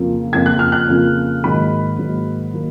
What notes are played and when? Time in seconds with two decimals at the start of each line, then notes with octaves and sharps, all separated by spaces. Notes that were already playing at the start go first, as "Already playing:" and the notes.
Already playing: F2 C#3 F3 A#3
0.33 F2 C#3 F3 A#3 G#6
0.46 F#6
0.59 F6
0.72 F#6
0.89 F2 C#3 F3 A#3
1.43 G#2 D#3 F#3 A#3 B5
1.99 G#2 D#3 F#3 A#3
2.54 D#3 F#3 A#3